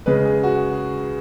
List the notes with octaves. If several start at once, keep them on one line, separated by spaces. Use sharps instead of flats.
C#3 G#3 B4
G#4
F#4